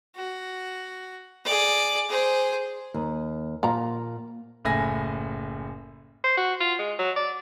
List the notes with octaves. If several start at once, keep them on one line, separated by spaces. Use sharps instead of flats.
F#4
G#4 D5
G#4 C5
D#2
A#2 F3 A#5
F#1 A2 G#5 A#6
C5
F#4
F4
G#3
F#3
D5